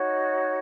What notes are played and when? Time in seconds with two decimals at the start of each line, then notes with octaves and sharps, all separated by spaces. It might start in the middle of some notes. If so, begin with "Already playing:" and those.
Already playing: D#4 F#4 C#5